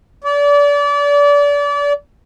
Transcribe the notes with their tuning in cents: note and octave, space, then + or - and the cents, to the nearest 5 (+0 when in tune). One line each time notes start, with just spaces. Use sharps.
D5 -30